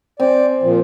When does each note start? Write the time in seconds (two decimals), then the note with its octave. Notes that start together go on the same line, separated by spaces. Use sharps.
0.20 C4 D5 G#5
0.62 A#2 F3